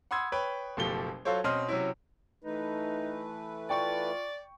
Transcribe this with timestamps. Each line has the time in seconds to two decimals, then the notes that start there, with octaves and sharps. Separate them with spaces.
0.11 F#5 B5 C6 D#6 E6 G#6
0.32 B4 C#5 G5 B5
0.77 F#1 B2 F3 A3 G4 G7
1.25 F#3 F4 A4 C5 C#5
1.44 B2 C4 C#4 D#5 C6 F6
1.69 C3 F#3 C#4 E4
2.44 E3 A3 D#4 B4
3.70 F4 D5 G5 C#6